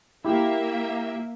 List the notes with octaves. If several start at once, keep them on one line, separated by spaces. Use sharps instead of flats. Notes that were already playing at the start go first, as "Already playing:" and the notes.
A#3 E4 G4 E5